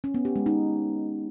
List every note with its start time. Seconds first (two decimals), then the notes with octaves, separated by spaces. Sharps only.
0.04 C#4
0.14 B3
0.25 G4
0.36 G#3
0.46 D#4